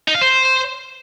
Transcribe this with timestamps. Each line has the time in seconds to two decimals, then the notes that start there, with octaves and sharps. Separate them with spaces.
0.08 D#4
0.15 F5
0.22 C5